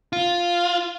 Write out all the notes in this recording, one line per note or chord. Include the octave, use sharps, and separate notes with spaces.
F4